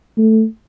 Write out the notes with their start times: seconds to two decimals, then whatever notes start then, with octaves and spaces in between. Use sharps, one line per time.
0.18 A3